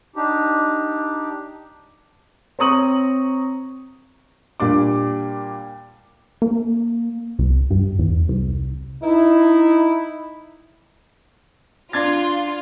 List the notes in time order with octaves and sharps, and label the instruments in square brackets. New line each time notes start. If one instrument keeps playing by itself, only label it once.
[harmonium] D4 D#4 G4
[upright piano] C4 C#5 A#5 C#6 D#6 F#7
[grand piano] A#2 G3 D4 D6
[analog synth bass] A#3
C2
G2
E2
C2
[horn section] D#4 E4
[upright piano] D4 G#6 A6 [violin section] F4